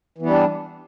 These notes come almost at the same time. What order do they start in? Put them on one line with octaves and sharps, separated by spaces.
E3 B3 G3 D4